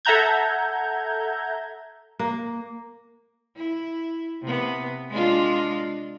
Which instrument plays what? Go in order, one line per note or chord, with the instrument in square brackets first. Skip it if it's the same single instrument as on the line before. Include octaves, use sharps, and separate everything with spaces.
[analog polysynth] A4 E5 F#5 A#5 G6 G#6
[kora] A#3
[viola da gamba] E4
C3 B3
G#3 D4 F4